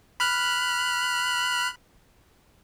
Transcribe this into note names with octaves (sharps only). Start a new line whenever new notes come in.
B5 F6 F#6